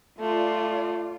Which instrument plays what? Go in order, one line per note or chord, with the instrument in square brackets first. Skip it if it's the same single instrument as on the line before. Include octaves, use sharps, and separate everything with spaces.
[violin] A3 [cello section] F4 D5 F5